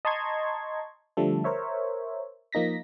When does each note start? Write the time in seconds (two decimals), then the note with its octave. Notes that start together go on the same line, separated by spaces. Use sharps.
0.05 D#5 A5 A#5 C6 C#6 G#6
1.17 D3 F3 G3 A3 A4
1.44 A#4 C5 C#5 E5
2.52 F3 A#3 D#4 A#6 B6